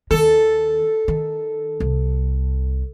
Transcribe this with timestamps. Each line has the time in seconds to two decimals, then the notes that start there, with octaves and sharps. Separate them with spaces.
0.11 D#2 D#3 A4
1.08 D#3
1.80 C2